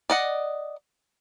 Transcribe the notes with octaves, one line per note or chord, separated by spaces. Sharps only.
D5 D#5 F#5